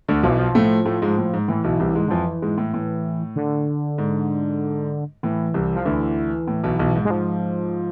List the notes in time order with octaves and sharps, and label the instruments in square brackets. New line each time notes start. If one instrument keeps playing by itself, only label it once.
[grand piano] D2 D3
[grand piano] B1 B2 [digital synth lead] F3
[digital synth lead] E3
F3
[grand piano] A2 A3
A2 A3
G#2 G#3
A2
G#2
[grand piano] A2 [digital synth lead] E3
[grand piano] B1 B2
C2 C3
G#2 G#3
[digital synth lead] D3
[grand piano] F2 F3 [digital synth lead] E3
[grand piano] G#2 G#3
A2
A2
[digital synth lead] D3
[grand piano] G#2
[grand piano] A2 [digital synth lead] E3
[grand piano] C2 C3
[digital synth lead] F3
[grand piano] D2 D3 [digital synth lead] E3
[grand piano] A2
B1 B2
B1 B2
G#2
[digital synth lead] G#3
F3